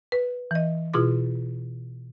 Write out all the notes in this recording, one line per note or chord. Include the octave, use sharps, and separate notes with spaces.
B4
E3 D#5
B2 E4 F4 G#4 C6 D6